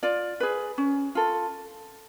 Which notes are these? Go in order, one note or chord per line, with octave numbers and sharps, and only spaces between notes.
F4 D5
G#4 B4
C#4
F4 A4